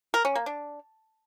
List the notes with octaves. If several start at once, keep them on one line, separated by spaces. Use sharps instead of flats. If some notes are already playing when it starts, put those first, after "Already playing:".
A#4
C#4
A#3
D4